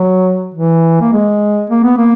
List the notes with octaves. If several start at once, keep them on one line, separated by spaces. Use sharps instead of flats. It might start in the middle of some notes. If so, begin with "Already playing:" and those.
Already playing: F#3
E3
A#3
G#3
A#3
B3
A#3